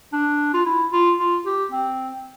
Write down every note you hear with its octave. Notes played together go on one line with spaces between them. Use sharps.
D4
F4
E4
F4
F4
G4
C4